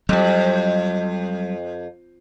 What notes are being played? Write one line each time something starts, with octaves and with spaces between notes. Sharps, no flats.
F2 F#3 G3